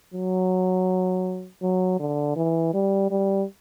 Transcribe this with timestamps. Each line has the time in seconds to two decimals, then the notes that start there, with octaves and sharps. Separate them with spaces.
0.14 F#3
1.62 F#3
1.99 D3
2.36 E3
2.73 G3
3.11 G3